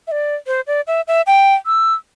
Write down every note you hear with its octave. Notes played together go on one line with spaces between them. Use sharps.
E5
D5
C5
D5
E5
E5
G5
E6